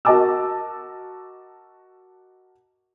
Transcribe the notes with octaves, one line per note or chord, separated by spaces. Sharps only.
F#4 A#4 D#5 A5 D6 E6